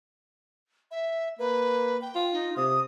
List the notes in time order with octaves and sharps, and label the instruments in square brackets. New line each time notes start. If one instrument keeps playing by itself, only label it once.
[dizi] E5
[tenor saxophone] A#3 [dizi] B4
[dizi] G5
[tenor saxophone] F4
[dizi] D#4
[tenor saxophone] C3 [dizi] D#6